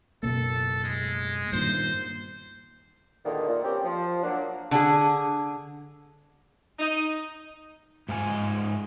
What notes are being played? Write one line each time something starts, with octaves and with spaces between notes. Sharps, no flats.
F#1 B2 A#3 A4
G#3
G2 A#2 D#3 C5
E2 A#2 D3 D#3
A#2
G3 C4 C#4 G4
F3
F#3 A#3 D4
D3 G#4
D#4
G#2 D#4 F4 A4 G#5